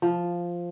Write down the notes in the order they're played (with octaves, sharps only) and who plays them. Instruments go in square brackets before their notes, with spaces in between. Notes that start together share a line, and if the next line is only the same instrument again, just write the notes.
[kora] F3